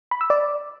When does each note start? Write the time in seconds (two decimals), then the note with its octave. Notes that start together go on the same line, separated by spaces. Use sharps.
0.11 B5
0.21 E6
0.30 D5